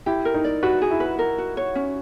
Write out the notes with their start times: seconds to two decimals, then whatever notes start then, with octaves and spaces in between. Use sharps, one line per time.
0.06 E4 G4
0.25 A#4
0.34 D#4
0.44 D5
0.63 F#4 B4
0.82 G#4
0.91 E4
1.00 B4
1.19 A#4
1.38 F#4
1.57 C#5
1.75 C#4